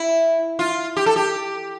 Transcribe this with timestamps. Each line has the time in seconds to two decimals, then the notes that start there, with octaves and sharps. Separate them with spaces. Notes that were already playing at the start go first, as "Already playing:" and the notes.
Already playing: E4
0.59 F4
0.97 G4
1.06 A4
1.16 G4